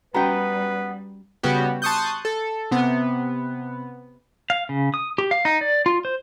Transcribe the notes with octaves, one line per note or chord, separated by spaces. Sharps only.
G3 B3 C#4 F#4 B4 G5 A#5
C#3 G3 B3 F#4 G4
A5 C6 C#6 D#6 F#6 G6
A4
C3 B3
F5
C#3
D#6
G4
F5
D#4
D5
F4
C5